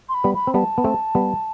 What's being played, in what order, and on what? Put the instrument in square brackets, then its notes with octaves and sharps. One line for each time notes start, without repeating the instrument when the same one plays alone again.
[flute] C6
B5
[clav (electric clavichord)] G3 B3
[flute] B5
[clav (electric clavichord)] C4
[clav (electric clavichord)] G3 B3 [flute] A5
[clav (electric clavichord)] B3
A3 C4
G3 B3